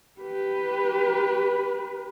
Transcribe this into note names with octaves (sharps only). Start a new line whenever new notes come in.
G4 B4